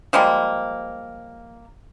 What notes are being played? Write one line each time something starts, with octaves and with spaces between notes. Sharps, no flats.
F3 G3 G#3 A#3